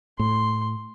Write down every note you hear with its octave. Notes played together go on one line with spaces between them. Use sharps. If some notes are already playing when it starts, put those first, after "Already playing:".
A2 C6